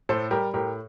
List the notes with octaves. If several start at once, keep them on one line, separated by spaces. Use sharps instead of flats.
A2 A4 C5
G3 G4 A#4
A2 G4 A#4